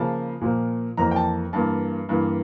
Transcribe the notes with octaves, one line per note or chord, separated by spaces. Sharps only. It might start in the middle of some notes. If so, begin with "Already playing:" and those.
Already playing: C#3 F3 A#3 A5
A#2 F3 A#3
F2 E3 A#3 A#5
G5
A5
G2 E3 A#3 A5
G2 E3 A#3